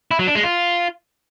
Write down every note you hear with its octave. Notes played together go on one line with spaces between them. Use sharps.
E4
F#3
D4
G#3
F4